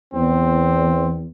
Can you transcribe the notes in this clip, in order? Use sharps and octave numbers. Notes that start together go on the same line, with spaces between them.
E2 C4